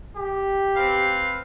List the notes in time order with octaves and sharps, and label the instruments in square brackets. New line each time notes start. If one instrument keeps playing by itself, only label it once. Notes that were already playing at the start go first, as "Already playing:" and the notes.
[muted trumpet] G4
[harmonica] C4 B4 F5